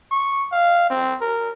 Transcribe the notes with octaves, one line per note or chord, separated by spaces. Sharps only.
C#6
F5
C4
A#4